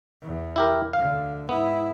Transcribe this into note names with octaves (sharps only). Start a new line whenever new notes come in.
E2
E4 G4 A#4
D2 D3 F5
G#2 B3 E4